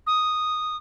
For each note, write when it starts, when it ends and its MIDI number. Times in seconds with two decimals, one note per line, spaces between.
0.06 0.76 87